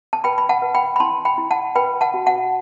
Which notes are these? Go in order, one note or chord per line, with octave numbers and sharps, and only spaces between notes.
A5
B4 G5 B5
B5
F#5 A5
B4
G5 B5
B5
E4 A5 C6
G5 B5
E4
F#5 A5
B4 G5 B5
F#5 A5
F#4
F#5 A5